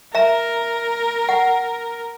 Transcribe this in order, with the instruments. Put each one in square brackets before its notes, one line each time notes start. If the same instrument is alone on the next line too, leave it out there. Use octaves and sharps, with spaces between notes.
[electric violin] A#4 [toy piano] E5 A#5
[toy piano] F#5